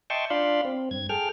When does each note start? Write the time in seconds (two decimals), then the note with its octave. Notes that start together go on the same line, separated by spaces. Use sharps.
0.10 D#5 E5 G5 A5 C6 C#6
0.30 D4 F4 D5 F5 B5 C6
0.65 C4
0.91 G2 G#6
1.09 G#4 A4 G5 F6